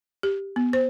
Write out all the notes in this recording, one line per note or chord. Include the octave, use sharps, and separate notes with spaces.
G4
B3
C5